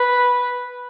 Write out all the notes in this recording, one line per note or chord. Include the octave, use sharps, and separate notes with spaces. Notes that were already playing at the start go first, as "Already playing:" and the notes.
Already playing: B4